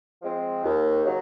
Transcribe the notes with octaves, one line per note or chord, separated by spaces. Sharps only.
F3 G#3 C4
D#2
C#3 F#3